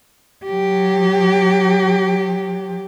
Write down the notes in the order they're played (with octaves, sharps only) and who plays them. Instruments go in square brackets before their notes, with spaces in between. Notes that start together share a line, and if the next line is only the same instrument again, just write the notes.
[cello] F#3 G4